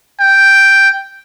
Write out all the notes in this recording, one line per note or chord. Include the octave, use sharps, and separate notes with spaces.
G5